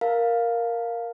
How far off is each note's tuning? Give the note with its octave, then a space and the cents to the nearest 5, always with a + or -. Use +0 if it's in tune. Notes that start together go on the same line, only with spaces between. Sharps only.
A#4 +0 F5 +0 A5 +20